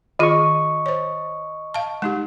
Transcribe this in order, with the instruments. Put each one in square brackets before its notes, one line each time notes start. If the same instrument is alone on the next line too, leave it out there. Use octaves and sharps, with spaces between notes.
[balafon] D#3 F4 G#4 [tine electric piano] D#5 C#6
[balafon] C5 C#5
F5 A5
G#3 D#4 G4